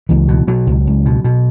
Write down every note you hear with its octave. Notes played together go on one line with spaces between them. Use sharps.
C#2 E3
B2
B2 F#3
C#2
C#2
B2
B2